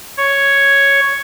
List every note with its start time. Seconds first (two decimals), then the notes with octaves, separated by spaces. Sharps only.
0.17 C#5